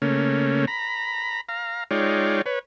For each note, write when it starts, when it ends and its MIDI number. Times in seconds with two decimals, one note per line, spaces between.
0.02 0.65 49
0.02 0.65 57
0.02 0.65 58
0.02 0.65 61
0.67 1.41 82
0.67 1.41 83
1.49 1.84 77
1.49 1.84 82
1.91 2.42 56
1.91 2.42 63
1.91 2.42 65
1.91 2.42 73
1.91 2.42 74
1.91 2.42 79
2.46 2.59 71
2.46 2.59 73